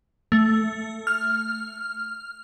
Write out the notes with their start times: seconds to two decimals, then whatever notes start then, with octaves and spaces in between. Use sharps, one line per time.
0.32 A3
1.07 F6